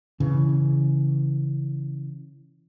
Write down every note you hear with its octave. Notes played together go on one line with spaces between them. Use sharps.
C#3 E3